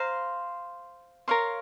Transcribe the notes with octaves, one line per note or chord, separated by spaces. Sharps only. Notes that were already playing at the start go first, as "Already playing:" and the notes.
Already playing: C5 F5 A#5
A#4 C#5 F5 C6